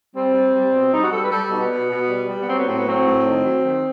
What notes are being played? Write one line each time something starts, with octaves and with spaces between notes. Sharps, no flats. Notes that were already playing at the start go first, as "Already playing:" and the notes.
G3 C4
G3
G3
B2
G3 D#4
F#4
G3 A4
B4
G3 A4
B2 D#4
B3
B2
B2
G3
G3
B3
F#3 C4
B3
A2 C4
B3
F#3 C4
A2
D#3
F#3
D#3